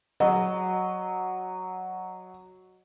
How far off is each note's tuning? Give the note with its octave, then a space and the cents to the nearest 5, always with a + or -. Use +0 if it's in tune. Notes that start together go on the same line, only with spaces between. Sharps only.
F#3 +0 D#5 -25